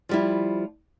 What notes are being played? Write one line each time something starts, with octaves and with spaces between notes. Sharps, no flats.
F3 G3 E4